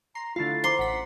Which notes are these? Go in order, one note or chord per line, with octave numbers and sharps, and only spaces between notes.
A#5 C6
D3 A3 E4 F4 A6 C7
C5 A#5 C6 D6
A1 F#5 B6